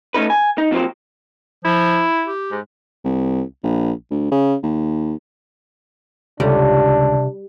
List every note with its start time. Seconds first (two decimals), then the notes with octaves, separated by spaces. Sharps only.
0.14 A3 C#4 D#4 B4
0.30 G#5
0.58 D#4
0.71 F2 C3 F3 F#3 A#3 C4
1.65 F3 E4
2.26 G4
2.51 G#2
3.05 C2
3.64 A#1
4.11 D2
4.32 C#3
4.63 D#2
6.40 C#2 C3 G3 D4